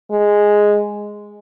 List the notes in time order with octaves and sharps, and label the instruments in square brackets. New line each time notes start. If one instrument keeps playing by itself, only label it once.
[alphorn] G#3